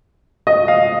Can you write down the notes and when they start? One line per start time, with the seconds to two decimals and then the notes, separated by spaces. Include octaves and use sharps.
0.47 D#5
0.68 F5